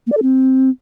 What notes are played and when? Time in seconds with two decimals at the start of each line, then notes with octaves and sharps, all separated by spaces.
0.07 A#3
0.12 D5
0.17 A4
0.22 C4